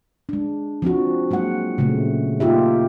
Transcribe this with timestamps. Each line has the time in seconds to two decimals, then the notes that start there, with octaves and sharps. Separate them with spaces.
0.29 G#3 D4
0.82 F3 C4 D4 F#4
1.31 F#3 G#3 A#3 F#5
1.78 A#2 C#3 G#3 A3
2.40 A#3 D#4 F4 G4 E5